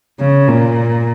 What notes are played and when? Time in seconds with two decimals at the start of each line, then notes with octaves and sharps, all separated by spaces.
0.20 C#3
0.48 A#2